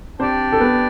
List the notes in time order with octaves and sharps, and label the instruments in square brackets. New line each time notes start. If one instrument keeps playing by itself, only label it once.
[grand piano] C4 C5 [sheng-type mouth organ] D4 G4 D5
[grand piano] A4
B3 B4